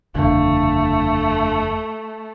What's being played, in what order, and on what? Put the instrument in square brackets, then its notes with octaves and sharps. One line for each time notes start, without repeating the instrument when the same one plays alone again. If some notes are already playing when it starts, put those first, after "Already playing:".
[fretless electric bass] F#1 E2 D3 [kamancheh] A3 [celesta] D4 F5